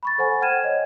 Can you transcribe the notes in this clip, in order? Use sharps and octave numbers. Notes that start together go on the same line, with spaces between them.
B5 C#6 A6
A4 C5 F#5 G#5 A6
F#5 G5 F6 G#6 D#7 E7
C#5 D#5